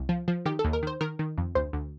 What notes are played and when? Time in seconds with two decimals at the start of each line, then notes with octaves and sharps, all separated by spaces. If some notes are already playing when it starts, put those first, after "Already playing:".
Already playing: C2
0.09 F3
0.28 F3
0.46 D#3 G4
0.59 A4
0.65 D#2
0.73 A#4
0.83 D#3 C5
1.01 D#3 A#4
1.19 D#3
1.38 F2
1.55 D2 C5
1.73 D2